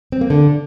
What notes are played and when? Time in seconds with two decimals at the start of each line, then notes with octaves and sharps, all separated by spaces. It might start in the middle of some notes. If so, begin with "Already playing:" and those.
0.12 C4
0.21 A#3
0.30 D3